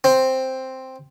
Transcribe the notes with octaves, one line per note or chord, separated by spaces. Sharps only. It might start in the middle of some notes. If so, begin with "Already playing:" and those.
C4